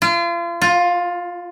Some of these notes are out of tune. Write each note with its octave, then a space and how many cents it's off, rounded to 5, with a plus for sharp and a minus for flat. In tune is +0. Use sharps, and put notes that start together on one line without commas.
F4 -35
F4 +15